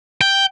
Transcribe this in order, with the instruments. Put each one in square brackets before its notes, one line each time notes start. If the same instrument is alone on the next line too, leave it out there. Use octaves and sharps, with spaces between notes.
[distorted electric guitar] G5